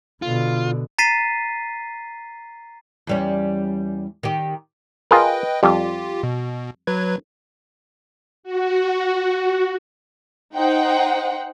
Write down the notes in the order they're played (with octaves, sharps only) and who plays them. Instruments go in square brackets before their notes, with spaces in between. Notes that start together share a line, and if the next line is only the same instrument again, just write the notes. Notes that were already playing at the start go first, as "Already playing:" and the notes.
[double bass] B2 D3 [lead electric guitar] F4
[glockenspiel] A#5 A6 B6 C7 D#7
[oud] E2 G3 C#4
D#3 G4
[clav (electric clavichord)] F4 G#4 A#4 [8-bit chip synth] B4 D#5 G5
[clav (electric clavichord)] F2 G3 [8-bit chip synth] F4 G4
[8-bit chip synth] B2
F#3 B4 G#6
[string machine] F#4
[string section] D#4 C5 F#5 G5